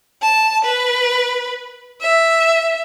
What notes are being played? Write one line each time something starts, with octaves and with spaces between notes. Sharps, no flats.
A5
B4
E5